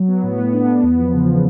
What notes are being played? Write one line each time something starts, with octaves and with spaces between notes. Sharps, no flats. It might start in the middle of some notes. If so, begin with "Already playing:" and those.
Already playing: F#3
B3
A2
B3
D4
B3
E2
F3
C#3